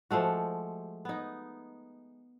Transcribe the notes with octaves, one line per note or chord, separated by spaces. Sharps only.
F3 G#3 A3 F#4
B3 D#4